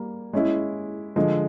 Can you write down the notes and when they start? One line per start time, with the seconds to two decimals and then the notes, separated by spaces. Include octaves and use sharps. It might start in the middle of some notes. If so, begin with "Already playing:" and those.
Already playing: G3 A#3
0.33 G#3 C#4 E4
1.16 D3 F3 G#3